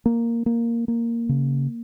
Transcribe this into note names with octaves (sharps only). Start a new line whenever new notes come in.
A#3
A#3
A#3
C#3